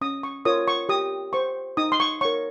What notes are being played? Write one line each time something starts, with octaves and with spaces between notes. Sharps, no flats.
C#4 D#6
C#6
F4 A#4 C#5 D#6
C#6
G4 D#6
C5 C#6
D#4 D#6
C6
C#6
A#4 C#5 C#6